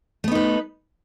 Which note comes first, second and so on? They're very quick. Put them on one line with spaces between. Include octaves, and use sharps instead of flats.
A3 B3 D#4 B4